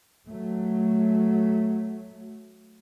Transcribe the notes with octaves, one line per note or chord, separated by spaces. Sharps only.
F#3 A3